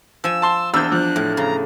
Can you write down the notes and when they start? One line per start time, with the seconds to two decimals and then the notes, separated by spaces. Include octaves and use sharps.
0.24 F3 G#5 E6
0.42 A5 C6
0.74 E2 D4 C5 E6 G6
0.92 F3 F#6
1.16 A2
1.37 C#3 A#5